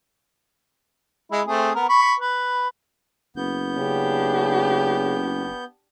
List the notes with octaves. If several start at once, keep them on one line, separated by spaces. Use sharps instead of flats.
G#3 E4
A3 C4 G#4
B3 A#4
B5 C#6
B4
F#1 B3 G6
C#3 D4 G4